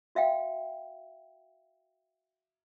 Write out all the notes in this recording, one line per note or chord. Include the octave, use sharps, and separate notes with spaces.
F#4 E5 F5 G5